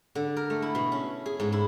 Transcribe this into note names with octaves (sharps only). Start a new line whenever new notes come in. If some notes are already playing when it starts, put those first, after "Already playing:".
D3
A#4
A3
E4
B2
C#4
G#4
G#2
E4